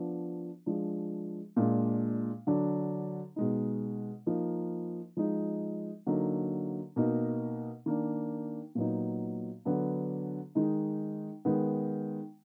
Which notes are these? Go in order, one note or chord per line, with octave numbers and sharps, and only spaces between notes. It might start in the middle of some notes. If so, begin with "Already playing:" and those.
Already playing: F3 B3 D4
F3 G#3 D4
A#2 G#3 D4
D3 F#3 D4
B2 G#3 D#4
F3 A#3 D#4
F3 G#3 D#4
D3 F#3 A#3 D#4
B2 A#3 D#4
D#3 A#3 D4
A#2 F#3 B3 D#4
D3 F#3 B3 D4
D#3 G#3 D#4
D#3 G#3 B3